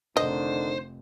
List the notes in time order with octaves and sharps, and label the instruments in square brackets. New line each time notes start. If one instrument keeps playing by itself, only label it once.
[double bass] F1 [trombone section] D3 D#3 [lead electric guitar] C5 [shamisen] D#5